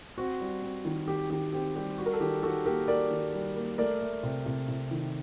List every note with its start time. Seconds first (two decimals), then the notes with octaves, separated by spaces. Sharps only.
0.17 C4 F#4
0.40 G3
0.62 C4
0.85 D#3
1.07 D#3 G4
1.30 D#3 G4
1.53 C4 G4
1.76 G3 G4
1.98 G3 F#4
2.06 A#4
2.13 A4
2.21 D#3 G4
2.43 D#3 F#4 A4
2.65 A#3 G4 A#4
2.88 A#3 A#4 D5
3.11 D#3
3.33 G3
3.56 A#3
3.78 A3 A#4 D5
4.01 A3
4.23 C3
4.46 C3
4.68 C3
4.91 D#3